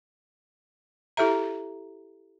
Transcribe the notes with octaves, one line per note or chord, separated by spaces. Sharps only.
E4 G4 A4 E5 A#5